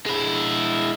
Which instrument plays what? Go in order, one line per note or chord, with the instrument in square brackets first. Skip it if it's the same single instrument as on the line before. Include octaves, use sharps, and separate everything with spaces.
[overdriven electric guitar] G#3 E4